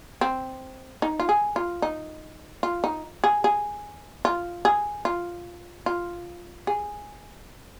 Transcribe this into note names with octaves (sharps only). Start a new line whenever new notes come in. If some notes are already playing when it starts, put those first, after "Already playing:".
C4
D#4
F4
G#4
F4
D#4
F4
D#4
G#4
G#4
F4
G#4
F4
F4
G#4